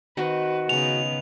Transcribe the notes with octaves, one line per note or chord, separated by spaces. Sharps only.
D#3 C4 D#4 F#4 B4
C#3 G#3 B3 D#4 F7